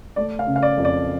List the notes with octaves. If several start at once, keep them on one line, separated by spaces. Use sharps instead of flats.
A3 D5
F5
C#3
F5
D5
F2
D5